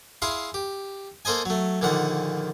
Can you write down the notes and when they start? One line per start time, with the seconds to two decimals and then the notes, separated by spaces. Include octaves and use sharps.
0.22 E4 G#4 F5 C6
0.54 G4
1.25 A#3 A4 C5 D#5 G#5
1.45 F#3 A3
1.81 A#1 A#2 D3 D#3 F#5